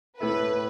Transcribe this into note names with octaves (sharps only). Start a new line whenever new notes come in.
A2 A3 E4 A4 B4 E5